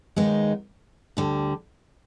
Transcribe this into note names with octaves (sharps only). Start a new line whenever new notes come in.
D#2 D#3 G#3 B3 D#4
D2 D3 G3